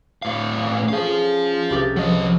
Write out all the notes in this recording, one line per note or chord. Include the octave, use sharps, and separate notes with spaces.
A2 F5
C#4 G#4 C5 F5
C2 G4 A6
F3 F#3 D#5